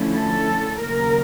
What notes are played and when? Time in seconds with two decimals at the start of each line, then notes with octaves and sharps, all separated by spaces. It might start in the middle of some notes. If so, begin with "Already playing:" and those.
Already playing: D3 F3 A3 C#4 E4
0.16 A4
0.80 D#2 C#3 F#3 A#4